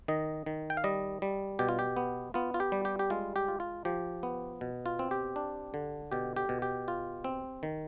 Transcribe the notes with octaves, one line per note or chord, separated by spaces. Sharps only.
D#3 D#5
D#3
G5
F5
G3 D#5
G3
B2 G4
F4
G4
B3
B3 F4
F4
G4
G3
G4
G4
G#3 F4
G4
F4
F4
F3 G4
B3
B2
F4
C4
G4
D4
D3
B2 G4
G4
B2
G4
F4
C4
D#3